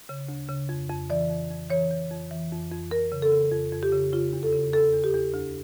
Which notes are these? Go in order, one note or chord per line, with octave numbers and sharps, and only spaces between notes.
C#3
D2
C#3
F2
F2
E3 D5
F2
F2
E3 C#5
E3
F2
E3
F2
F2
F2 A#4
C#3
A4
C#3
F2
F2
G4
C#3
C#3 F4
E2
A4
C#3
E2 A4
E2
G4
E2
D2